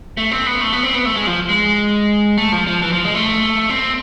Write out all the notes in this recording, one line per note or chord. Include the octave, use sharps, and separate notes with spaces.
A3
C4
B3
A3
B3
C4
B3
A3
G#3
F3
G#3
A3
F3
F3
E3
F3
G#3
A3
C4